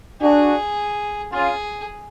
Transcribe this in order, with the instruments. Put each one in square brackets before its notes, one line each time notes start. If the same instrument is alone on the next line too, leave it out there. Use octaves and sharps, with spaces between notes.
[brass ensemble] D4 F#4 [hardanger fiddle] G#4
[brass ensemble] C#4 F4 [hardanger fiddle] G#4